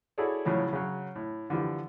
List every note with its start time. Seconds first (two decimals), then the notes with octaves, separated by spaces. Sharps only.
0.18 E4 F#4 G#4 A4 C#5 D5
0.45 A2 C#3 F3 F#3
0.73 C#3 F#3
1.16 A2
1.50 D3 E3 F3 G3